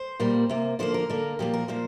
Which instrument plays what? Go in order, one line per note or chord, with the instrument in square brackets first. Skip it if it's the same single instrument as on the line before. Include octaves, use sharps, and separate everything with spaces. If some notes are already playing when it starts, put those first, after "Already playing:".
Already playing: [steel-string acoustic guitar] C5
A#2 G3 A#3
C3 A#3
D3 F3 A#3 C5
A#4
D3 A#3
A#2 F3 A#3 G4
A#4
A#2 F3 A#3 C5